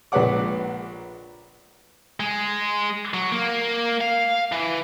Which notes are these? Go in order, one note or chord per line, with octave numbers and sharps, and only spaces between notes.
A#1 G#3 B4 C#5 F#5 D6
G#3
F#3
A#3
F5
E3